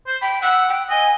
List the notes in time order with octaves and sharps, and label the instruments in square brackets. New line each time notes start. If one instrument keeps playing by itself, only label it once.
[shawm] C5
[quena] G5 [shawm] B5
[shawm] F#5 [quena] E6
[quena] G5
[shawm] D#5 [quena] G#5